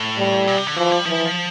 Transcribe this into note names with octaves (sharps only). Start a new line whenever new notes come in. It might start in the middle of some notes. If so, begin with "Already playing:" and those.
Already playing: A2
G3
A#2
C3
D3
E3 F3
G3
E3 F3